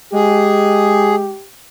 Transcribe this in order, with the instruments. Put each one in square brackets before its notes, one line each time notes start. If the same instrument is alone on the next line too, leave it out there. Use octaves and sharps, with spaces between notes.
[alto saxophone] G#3 [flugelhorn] G4 [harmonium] G#4